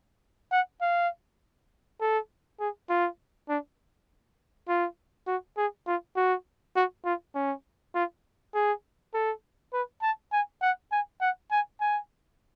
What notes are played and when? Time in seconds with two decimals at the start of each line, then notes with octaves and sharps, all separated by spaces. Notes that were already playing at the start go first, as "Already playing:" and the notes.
0.52 F#5
0.81 F5
2.01 A4
2.60 G#4
2.90 F4
3.49 D4
4.68 F4
5.27 F#4
5.57 G#4
5.87 F4
6.16 F#4
6.76 F#4
7.05 F4
7.35 C#4
7.95 F4
8.54 G#4
9.14 A4
9.73 B4
10.02 A5
10.32 G#5
10.62 F#5
10.92 G#5
11.21 F#5
11.51 G#5
11.81 G#5